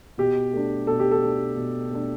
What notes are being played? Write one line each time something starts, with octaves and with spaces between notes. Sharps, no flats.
B2 G4
A3 D4
B2 A4
G4
A4
A3 D4
B2
A3 D4